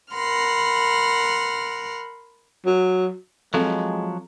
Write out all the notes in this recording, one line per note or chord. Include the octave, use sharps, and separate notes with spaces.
A#4 F#5 B5 C6 F6
F#3
F3 F#3 G#3 C4 A4